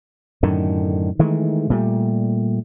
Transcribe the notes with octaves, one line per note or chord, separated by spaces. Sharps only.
F#2 A2 D3 D#3
D#3 E3 G#3 A3
A#2 G3 A3